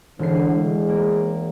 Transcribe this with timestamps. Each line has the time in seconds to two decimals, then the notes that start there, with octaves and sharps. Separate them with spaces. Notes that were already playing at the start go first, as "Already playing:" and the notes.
0.19 E1 D3 C7
0.54 G#3
0.89 A#3